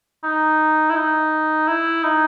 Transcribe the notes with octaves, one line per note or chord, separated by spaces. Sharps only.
D#4
E4
D#4
E4
D#4